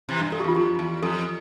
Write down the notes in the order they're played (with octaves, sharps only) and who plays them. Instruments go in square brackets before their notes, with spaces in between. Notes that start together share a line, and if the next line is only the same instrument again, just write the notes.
[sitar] C3 E3
G2
[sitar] G2 [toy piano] A4
[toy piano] G4
[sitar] E2 [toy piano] F4
[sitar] F2 [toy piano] G4
[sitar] E2
[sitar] F2 [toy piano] A4